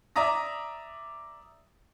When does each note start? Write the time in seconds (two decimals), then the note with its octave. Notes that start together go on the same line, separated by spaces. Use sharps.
0.16 D5 E5 A#5 D#6 A#6